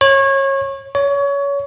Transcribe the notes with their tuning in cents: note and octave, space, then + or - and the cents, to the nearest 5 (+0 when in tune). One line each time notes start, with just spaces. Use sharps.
C#5 -25
C#5 +25